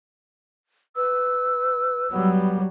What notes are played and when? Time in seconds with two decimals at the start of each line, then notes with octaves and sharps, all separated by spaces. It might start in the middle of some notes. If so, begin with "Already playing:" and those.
0.96 B4 E6
2.11 F#3 G3 B3